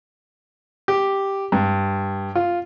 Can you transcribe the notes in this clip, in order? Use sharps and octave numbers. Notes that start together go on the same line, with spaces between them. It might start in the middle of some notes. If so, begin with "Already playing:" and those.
G4
G2
F4